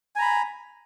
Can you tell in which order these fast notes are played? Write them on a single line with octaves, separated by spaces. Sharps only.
G#5 A#5 B5